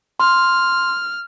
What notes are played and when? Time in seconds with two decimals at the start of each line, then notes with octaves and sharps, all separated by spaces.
0.20 C6 F6